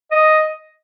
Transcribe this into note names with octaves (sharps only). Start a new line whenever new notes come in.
D#5